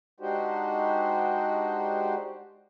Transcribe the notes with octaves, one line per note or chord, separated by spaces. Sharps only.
G#3 D4 D#4 F#4 G4 C5